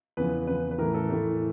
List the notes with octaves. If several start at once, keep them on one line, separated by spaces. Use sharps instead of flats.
E2 C#3 F3 B4
E2 C#3 F3 B4
B4
A2 E3 A3 A#4
A4
A2 E3 A3